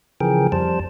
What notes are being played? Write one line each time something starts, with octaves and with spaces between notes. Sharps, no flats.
C#3 E3 F3 G#4 A#4 G5
F2 G3 C5 A5